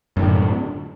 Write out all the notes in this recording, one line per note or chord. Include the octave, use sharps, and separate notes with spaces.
F#2 A2 D3